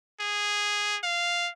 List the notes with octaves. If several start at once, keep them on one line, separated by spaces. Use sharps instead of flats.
G#4
F5